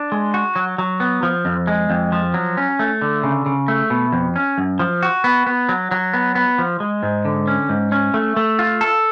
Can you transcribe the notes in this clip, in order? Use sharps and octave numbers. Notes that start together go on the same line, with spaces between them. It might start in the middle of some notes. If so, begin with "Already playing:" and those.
Already playing: D4
G#3
F#4
F#3
F#3
B3
F3
F2
G#3
F2
F3
F#3
C#4
A3
D3
C#3
C#3
A3
B2
F2
C#4
F#2
F3
F#4
B3
B3
F#3
F#3
B3
B3
F3
G#3
G#2
D3
C#4
G#2
C#4
A3
A3
F4
A4